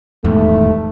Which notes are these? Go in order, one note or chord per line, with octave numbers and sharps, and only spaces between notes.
D#1 E2 G#2 A3